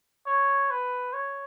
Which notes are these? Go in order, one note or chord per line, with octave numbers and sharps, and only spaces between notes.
C#5
B4
C#5